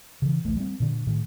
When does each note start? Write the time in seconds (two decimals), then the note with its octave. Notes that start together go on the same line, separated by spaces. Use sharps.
0.22 C#3 E3
0.44 D1 A1 A3
0.57 G3 C4
0.80 A#2 D3
1.07 A2 D#3